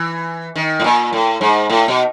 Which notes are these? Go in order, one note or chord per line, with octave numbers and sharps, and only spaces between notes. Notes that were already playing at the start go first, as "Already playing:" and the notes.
Already playing: E3
D#3
A2
A#2
A2
G#2
A2
B2